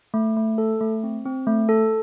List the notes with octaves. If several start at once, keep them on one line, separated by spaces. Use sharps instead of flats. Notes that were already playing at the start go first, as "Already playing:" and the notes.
A3
A3
A4
A3
C4
C4
A3
A4